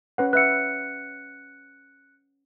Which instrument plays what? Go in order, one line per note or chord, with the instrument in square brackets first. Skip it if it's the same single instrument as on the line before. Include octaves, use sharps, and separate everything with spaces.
[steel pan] C#4 B4 F#5
[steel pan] B4 E5 F#5 [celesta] F#6 C#7